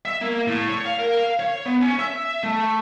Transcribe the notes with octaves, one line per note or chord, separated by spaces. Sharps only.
E5
A#3
A2
C#5
F5
A#4
F5
C#5
B3
C#4
E5
A3